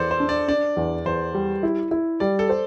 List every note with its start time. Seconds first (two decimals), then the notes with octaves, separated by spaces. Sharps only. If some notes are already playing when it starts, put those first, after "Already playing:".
Already playing: E2 A4 C5 D5
0.11 C5
0.20 D4
0.29 D5
0.48 D4 D5
0.77 E2
1.05 E2 C5
1.34 G3
1.63 E4
1.91 E4
2.20 G3 D5
2.39 A4
2.49 C5